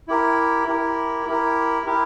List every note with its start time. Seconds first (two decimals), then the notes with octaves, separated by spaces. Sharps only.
0.08 E4 G4 A#4
0.67 E4 G4 A#4
1.26 E4 G4 A#4
1.86 E4 G4 A#4